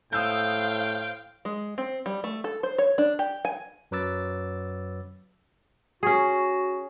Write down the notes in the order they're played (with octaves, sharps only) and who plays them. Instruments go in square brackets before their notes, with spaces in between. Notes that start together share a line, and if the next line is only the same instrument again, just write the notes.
[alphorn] A2 [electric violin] C5 F5 [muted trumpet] G5 [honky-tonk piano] D#6 E6 G6
[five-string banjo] G#3
C4
G3
A3
A4
C5
C#5
D4
G4
G#5
[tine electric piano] F#2 F#3 B4 D6 E6 A6
[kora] C#4 G#4 [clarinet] F#4